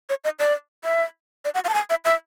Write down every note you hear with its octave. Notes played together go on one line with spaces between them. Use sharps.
C#5
D#5
D5
E5
D5
F#5
F5
A5
G#5
E5
E5